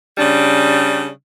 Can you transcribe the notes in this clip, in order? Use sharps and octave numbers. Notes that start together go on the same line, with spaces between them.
C#3 G3 D4